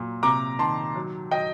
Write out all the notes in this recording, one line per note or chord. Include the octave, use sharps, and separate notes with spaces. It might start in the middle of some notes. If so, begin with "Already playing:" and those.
Already playing: A#2 F#3
C3 A#5 D6
D#3 A5 C6
F#3
F#3 D#5 G5